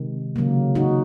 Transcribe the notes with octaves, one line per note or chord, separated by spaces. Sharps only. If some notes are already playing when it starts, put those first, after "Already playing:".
Already playing: C3 D#3 G#3
C#3 F#3 A#3
D#4 F#4